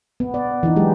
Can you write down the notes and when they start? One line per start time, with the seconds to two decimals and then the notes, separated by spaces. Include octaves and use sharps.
0.20 B3
0.34 D5
0.63 E3 D4 D#4
0.76 F#3 G#3 G4